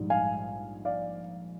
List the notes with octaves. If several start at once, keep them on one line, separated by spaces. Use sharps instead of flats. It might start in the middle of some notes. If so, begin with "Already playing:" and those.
Already playing: A#1 G#2 G3
F5 G#5
D5 F5